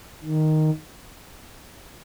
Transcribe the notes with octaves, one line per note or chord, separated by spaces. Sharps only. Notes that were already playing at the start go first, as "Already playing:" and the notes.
D#3